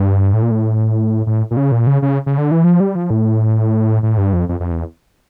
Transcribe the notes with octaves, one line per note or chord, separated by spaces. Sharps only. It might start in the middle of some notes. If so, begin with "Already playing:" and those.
Already playing: G2
A2
A#2
A2
A2
A#2
C#3
A#2
C#3
C#3
C#3
D3
E3
F3
G3
F3
A2
A2
G2
F2
F2
F2
E2